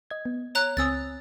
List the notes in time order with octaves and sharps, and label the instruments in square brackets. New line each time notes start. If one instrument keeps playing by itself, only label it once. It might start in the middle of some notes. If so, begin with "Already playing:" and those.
[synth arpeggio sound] D#5 G#6
B3
[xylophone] C#5 A#5 F#6
[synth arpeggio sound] C#2 C4 G#5 [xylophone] D#6 E6 A6